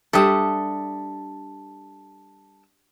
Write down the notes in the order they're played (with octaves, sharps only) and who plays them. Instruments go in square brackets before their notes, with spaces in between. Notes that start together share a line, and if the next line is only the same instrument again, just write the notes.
[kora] G3 D4 E5 [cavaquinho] A4 D#6